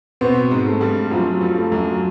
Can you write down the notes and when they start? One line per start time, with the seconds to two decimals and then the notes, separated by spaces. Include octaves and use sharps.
0.21 B2 B3 C4
0.51 G#2 G#3
0.66 A3
0.81 G2 G3
1.11 F#2 F3 F#3
1.41 G2 G3
1.56 A3
1.72 F#2 F#3